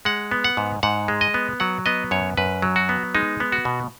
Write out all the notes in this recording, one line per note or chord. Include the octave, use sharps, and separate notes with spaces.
G#3 F#5
B3
F#5
G#2
G#2 F#5
G#3
D#5
B3
F#3 F#5
B3 D#5
F#2 C#5
F#2 B4
F#3
F#4
B3
G#3 D#4
B3
F#4
B2